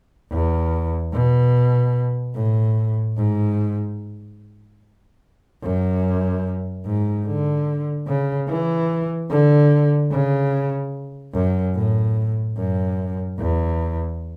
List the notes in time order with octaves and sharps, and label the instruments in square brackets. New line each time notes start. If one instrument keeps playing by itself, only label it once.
[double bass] E2
B2
A2
G#2
F#2
G#2
D3
C#3
E3
D3
C#3
F#2
A2
F#2
E2